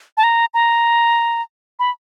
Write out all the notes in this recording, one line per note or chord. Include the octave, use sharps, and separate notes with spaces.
A5
A#5
A#5
B5